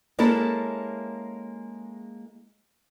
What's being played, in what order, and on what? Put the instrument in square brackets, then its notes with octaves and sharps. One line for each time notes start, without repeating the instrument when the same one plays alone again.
[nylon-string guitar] G#3 A#3 C#4 E4 G#4 A4